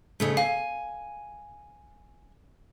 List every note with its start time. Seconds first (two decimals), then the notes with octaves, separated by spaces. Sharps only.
0.20 F2 C#3 A3
0.37 F5 G#5